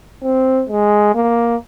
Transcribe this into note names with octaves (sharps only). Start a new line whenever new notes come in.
C4
G#3
A#3